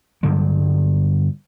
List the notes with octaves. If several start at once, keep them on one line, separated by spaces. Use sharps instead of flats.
G2 D3 F#3 G3